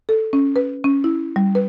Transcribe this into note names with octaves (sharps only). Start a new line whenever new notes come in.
A4
C#4
B4
C#4
E4
G3
B4